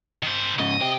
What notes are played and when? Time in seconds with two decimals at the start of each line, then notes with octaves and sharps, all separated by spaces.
0.23 D#3 C5
0.60 G#2 C#3 D#5
0.81 C4 G4